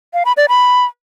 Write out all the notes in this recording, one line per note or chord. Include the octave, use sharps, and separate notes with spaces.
F5
B5
D5
B5